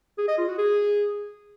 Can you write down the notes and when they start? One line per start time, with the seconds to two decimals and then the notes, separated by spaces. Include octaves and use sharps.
0.18 G#4
0.28 D#5
0.38 F4
0.48 F#4
0.58 G#4